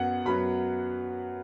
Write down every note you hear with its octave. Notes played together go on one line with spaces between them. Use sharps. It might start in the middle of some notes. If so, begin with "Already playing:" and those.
Already playing: F#2 F#3 B3 F#5
F#2 F#3 B3 B5